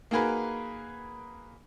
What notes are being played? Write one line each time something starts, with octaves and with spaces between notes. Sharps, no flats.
A#3 D#4 F#4 G#4 A#4 B4